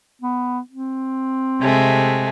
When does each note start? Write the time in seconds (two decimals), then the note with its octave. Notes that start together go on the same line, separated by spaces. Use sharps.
0.22 B3
0.70 C4
1.62 C3 G#3 A3